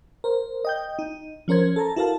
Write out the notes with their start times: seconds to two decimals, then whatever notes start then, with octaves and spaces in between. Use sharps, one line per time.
0.24 A#4 C5
0.65 D#5 G5 G6
0.99 D#4
1.48 F3 C#4 A#4 C5 G#6
1.76 A4 A5 A#5
1.96 E4 F#4 A4 A#4 F5 A5